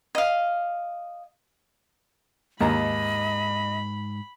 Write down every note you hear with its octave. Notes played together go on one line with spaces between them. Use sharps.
D#5 F5
D#2 G#2 D#5 A#5 B5